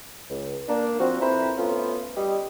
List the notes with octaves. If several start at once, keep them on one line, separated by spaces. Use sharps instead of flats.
C#2
A#3 D4
F3 C4 F#4
F2 C4 E4 B4 C5 A#5
A3 B3 C#4 F4
G3 G4 D#5